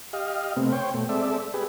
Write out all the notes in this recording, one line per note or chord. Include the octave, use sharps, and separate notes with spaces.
G4 D#5 F5
C3 A3 B3 C4
C5 C#5 G5
B2 A3
G#3 C4 A4 D5 E5
G4 G#4 B4